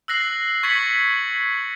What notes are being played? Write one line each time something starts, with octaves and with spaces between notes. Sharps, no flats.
E6 F#6 A#6 C7 F#7
C#6 G#6 A6 B6 C#7 F#7